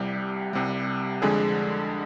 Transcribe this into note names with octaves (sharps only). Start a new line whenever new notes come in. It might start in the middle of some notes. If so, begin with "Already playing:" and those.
Already playing: C2 C3 G3 G4
C2 C3 G3
F2 D3 G#3 G#4